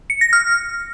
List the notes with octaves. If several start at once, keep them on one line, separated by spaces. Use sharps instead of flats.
C#7
A#6
F6